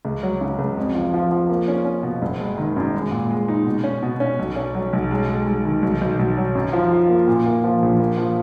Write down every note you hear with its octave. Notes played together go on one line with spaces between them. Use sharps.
C#2
F#3
C#3
C#2
F2
F3
F3
F3
A#3
C#4
C#4
B2
F#1
G#3
D#3
F#2
G#3
A#2
G#3
D#4
B2
C#4
B2
C#4
B1
C#4
F#3
B1
G#3
G#3
G#3
D#3
B1
B1
B1
F#3
F#2
F3
F4
A#3
A#2
A#3
F3
A#1
A#3
F3